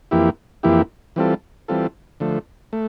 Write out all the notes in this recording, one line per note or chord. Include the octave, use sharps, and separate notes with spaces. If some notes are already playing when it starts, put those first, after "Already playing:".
F2 E3 A#3 E4 G4
F2 E3 A#3 E4 G4
E3 G3 C4 F4 A4
E3 G3 C4 F4 A4
D3 F3 A3
A3